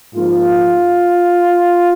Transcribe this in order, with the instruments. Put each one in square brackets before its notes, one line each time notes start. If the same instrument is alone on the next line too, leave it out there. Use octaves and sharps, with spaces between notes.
[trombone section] G#2 F3 A#3 F4